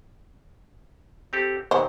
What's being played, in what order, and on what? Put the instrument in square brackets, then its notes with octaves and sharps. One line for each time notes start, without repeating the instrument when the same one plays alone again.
[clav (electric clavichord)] C4 G4 A4
[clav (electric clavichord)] D#2 A#2 [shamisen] D#3 C5